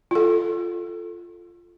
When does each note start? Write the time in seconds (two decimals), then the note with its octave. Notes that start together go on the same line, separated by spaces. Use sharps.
0.11 F4 A4